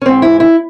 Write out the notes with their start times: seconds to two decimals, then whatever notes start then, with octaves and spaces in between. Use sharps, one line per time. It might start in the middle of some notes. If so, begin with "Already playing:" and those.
0.01 C#4
0.06 G#2 E3 C4
0.22 E4
0.40 E4